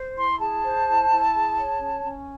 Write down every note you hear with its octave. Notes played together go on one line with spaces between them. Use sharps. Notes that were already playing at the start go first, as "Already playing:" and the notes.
Already playing: C5
E4 C6
G#4 A5
C5
E4
E4
G#4
C#5
C#4
C#4